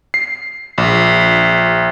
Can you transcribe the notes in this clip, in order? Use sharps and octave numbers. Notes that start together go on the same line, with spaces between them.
C7
A#1